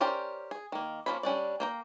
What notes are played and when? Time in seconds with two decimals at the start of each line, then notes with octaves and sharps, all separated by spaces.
0.01 C#4 G4 A#4 C5 D5
0.51 G#4
0.72 D#3 A#3
1.06 F3 G3 A#3 C#4 B5
1.23 G3 C#4 D4 D5
1.60 A#3 G5 A#5